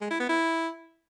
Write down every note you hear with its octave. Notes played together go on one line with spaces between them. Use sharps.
G#3
E4
B3
E4